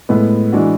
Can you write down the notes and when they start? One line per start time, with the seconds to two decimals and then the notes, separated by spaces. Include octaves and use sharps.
0.09 A2 G#3 B3
0.53 E3 G#3 D4 F#4